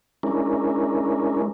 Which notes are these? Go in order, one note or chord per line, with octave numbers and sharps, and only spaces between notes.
G#3 C#4 D4 E4 A#4